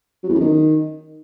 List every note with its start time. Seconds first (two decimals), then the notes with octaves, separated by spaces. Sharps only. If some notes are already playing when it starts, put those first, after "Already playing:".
0.24 F#3
0.29 E2
0.35 F#2
0.41 D#3